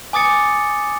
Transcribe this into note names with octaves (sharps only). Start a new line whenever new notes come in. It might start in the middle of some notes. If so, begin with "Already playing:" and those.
G#5 D6 D#6 A6 C#7